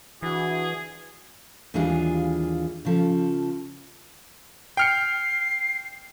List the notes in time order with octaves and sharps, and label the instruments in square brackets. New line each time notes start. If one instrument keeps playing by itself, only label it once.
[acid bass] E3 [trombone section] D4 E4 F#4 [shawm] G#4
[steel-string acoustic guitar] D#2 E3 G3 D4 F4 G#4
C#3 F3 A4
[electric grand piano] G5 F6 C#7 [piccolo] C7